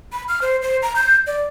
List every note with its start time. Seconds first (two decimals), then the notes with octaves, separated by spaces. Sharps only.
0.12 B5
0.28 F6
0.42 C5
0.62 C5
0.82 A#5
0.96 G6
1.27 D5